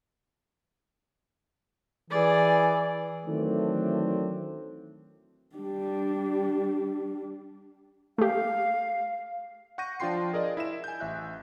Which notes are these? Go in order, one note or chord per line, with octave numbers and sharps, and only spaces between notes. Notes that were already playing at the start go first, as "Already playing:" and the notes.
E3 G#4 D5
D#3 E3 F#3 A3 C4 D4
G3 D4
A3 G4 F5
F#5 C#6 G6 A#6 D#7
F3 D4 F4 G5 C6 C7
G#4 A#4 D5 D#5
E4 E5 E7
G#5 G6
A1 E5 F#6